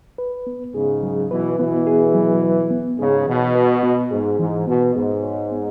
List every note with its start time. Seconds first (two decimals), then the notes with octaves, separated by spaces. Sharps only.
0.18 B4
0.47 B3
0.74 G#2 C#3 G#4
1.03 F#3
1.31 B2 E3 B4
1.59 B2 E3 B3
1.87 G#4
2.15 F#3
2.43 B4
2.71 B3
2.99 G#2 C#3 G#4
3.27 B2 E3
3.55 B4
3.83 B3
4.11 G#2 G#4
4.39 G#2 E3
4.67 B2 B3
4.96 G#2 G#4
5.23 C#5
5.51 B3